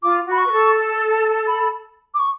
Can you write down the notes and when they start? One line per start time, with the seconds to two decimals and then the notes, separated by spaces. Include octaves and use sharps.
0.03 F4 D6
0.26 F#4
0.32 B5
0.38 C#6
0.47 B4
0.51 A4
1.47 B5
2.14 D6
2.19 C#6